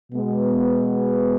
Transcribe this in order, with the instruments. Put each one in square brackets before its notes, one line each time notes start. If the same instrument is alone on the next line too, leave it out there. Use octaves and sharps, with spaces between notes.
[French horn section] B2 G#3 B3